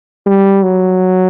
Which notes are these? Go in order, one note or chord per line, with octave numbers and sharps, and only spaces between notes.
G3
F#3